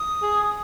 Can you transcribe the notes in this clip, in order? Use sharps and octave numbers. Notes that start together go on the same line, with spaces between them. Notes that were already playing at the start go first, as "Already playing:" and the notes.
Already playing: D#6
G#4